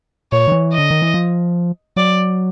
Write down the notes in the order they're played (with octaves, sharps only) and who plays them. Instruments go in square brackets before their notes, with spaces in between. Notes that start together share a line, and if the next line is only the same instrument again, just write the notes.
[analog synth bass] A#2 [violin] C#5
[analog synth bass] D#3
E3
[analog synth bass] D3 [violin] D#5
[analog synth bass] D#3
E3
F3
[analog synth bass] F#3 [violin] D5